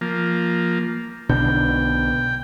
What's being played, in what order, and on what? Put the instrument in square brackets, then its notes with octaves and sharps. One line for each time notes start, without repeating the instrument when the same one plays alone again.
[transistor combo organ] F3 A#3
[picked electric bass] B1 B2 D3 [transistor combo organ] G5